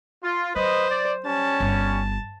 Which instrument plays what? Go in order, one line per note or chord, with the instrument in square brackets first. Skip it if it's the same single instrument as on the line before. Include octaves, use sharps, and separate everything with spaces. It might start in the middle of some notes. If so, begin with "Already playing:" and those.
[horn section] F4
[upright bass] F#3 [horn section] B4 D#5 [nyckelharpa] C5
[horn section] D5
[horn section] G3 C#4 [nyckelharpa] A5
[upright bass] G1